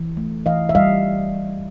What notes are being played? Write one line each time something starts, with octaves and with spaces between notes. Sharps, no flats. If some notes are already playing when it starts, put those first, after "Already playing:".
Already playing: E3
A3
E3 D#5 F5
E5
G3 D#5 F5